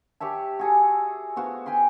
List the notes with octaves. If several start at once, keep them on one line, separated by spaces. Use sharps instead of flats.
G4 C#5 E5 A5
F#4 G#4 A4
B3 F4 F#4 C5
G5 G#5 B5 C6